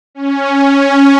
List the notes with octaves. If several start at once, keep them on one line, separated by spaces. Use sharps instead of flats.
C#4
C#4